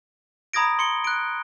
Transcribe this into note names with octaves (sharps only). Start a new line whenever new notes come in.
A#5 B5 D#6 G#6 A#6 D7
C6 C#7 G7
F#6 D7